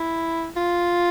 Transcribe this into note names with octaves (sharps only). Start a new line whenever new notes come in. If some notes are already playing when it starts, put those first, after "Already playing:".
Already playing: E4
F4